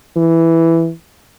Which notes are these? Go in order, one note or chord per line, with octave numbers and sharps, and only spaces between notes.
E3